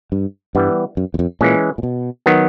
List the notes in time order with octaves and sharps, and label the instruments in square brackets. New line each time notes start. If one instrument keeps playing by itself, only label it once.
[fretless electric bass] G2
[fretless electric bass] G2 [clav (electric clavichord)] E3 G3 B3
[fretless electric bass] F#2
E2
F2
[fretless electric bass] A#2 [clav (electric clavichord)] E3 G#3 C#4
[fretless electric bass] A#2
B2
[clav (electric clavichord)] D#3 F#3 B3